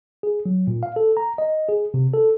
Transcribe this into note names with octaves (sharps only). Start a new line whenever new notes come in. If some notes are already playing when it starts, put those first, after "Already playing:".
G#4
F#3
A#2
F5
A4
A#5
D#5
G#4
C3
A4